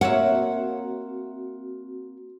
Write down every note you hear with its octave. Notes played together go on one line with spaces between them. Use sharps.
A#3 C4 F#4 C#5 E5 F#5